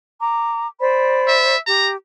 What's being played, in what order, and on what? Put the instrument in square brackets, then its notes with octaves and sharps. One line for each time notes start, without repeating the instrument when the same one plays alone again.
[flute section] A#5 D6
C5 D5 B5
[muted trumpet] E5
[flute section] G4 [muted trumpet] A#5